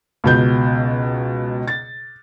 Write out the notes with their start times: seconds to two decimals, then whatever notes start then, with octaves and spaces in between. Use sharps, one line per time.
0.24 C#2 B2 G6
1.68 A6